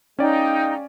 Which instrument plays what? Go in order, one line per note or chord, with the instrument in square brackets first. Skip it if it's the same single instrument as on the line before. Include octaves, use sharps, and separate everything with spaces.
[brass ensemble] G#3 F5 G5 [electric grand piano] C#4 D5 [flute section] D#4